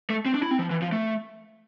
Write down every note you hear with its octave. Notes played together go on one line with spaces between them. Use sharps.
A3
C4
D4
E4
C4
F3
E3
F3
A3